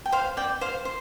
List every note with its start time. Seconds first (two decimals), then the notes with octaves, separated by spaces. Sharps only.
0.06 G5
0.12 C5 F5
0.37 D5 G5
0.61 C5 F5
0.85 C5